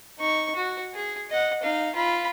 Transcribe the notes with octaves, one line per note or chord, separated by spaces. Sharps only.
D#4 C#6
F#4
G#4
D#5 F#5
D#4 F5
F4 B5